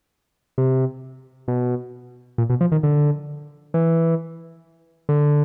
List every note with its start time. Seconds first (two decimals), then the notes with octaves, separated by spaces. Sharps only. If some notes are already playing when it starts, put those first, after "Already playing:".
0.58 C3
1.48 B2
2.38 A#2
2.50 B2
2.61 F3
2.72 D#3
2.83 D3
3.74 E3
5.09 D3